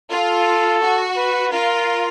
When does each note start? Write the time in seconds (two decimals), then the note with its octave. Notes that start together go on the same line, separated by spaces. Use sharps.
0.11 F4 A4
0.82 F#4
1.17 B4
1.52 F4 A#4